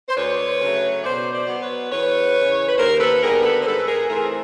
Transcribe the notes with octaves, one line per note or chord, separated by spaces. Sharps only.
C5
D2 B4 C#5
C#3 F#3 A3
B2 C5 D5
C5 D5
F#3 B3
B4 C#5
E2 B4 C#5
C#3 E3
B4
D#2 A#4 C5
A4 B4
D3 G3 B3 G#4 A#4
A4 B4
C5
G#2 A4 B4
G#4 A#4
E3 A3 C4 G#4 A#4